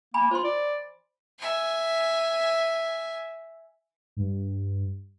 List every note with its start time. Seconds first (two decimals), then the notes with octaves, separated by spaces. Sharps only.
0.14 A#3 G#5 B5
0.31 F4 C5 C6
0.44 D5
1.39 E5 G#5
4.17 G2